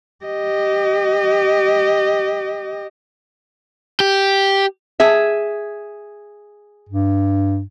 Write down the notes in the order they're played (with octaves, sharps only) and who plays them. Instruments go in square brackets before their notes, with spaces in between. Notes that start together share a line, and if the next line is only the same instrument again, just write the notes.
[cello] G4 D#5
[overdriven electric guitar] G4
[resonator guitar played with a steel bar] G#4 E5
[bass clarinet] G2